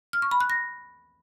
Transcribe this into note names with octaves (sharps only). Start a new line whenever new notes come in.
F6
C#6
B5
F#6
A#6